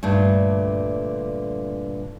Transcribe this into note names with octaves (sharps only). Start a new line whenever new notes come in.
G2 A#2 D3 A3